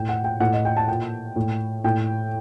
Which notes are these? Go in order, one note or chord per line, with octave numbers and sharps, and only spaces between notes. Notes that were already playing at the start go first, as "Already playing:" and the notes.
Already playing: A2 G5
F#5
G5
A2 F#5
D#5
G5
A5
A#2 G5
A2
A2 G5